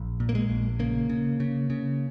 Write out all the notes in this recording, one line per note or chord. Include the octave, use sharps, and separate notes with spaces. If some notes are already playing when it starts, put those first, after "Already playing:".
Already playing: A#1
A#2
A#3
G#3
A#1
C#3 A#3
C#3
C#3
C#3